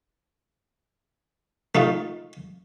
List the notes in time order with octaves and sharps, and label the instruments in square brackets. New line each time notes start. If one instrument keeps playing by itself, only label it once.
[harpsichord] A3 D#4 F4